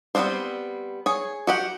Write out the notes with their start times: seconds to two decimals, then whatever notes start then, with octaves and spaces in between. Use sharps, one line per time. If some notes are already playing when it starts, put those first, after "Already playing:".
0.15 G3 B3 C4 D4 C5
1.06 G#4 C#5
1.47 F#4 G4 F#5